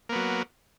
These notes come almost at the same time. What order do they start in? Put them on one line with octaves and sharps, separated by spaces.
A#3 B3 F#3